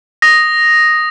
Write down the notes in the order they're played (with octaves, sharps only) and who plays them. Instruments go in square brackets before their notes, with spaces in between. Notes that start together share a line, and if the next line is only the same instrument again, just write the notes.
[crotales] D#6 A#6